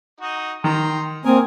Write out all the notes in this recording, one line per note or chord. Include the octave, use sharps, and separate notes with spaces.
D#4 F#4 D#5
D#3 G5 A#5 C6
A#3 C4 A#4 G#5 D#6